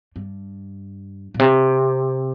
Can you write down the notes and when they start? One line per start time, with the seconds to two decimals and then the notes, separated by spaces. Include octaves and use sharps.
0.16 G2
1.34 A#2
1.39 C3